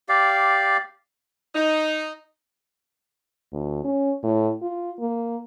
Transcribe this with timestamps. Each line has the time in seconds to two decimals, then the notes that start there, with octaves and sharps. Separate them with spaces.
0.09 G4 D5 F5
1.55 D#4
3.52 D2
3.84 C#4
4.23 A2
4.62 F4
4.99 A#3